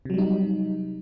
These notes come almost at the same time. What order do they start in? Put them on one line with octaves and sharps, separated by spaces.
C3 F#3 G3 D#4